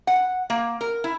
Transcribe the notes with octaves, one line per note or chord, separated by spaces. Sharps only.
F#5
A#3
A#4
E4